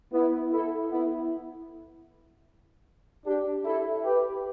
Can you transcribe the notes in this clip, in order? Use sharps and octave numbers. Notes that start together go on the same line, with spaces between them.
B3 E4
E4 A4
B3 E4
D4 G4
E4 A4
G4 B4